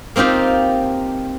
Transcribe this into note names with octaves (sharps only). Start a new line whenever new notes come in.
A#3 C4 D#4 F4 G4